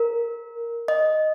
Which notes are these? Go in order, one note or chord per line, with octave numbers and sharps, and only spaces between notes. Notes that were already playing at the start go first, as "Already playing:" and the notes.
Already playing: A#4
D#5